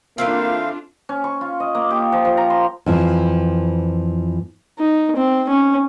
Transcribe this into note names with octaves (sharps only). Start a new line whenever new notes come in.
E3 A3 A#3 C4 D4 F4 F5
C#4
C#6
F4
D#5
A#3
G4
F3
F3
A#5
C6
F2 E3 F3
D#4
C4
C#4